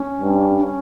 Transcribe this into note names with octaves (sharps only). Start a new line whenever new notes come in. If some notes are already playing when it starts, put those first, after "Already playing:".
Already playing: C#4
G2
D4
C#4